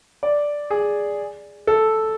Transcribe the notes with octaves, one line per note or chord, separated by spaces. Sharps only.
D5
G#4
A4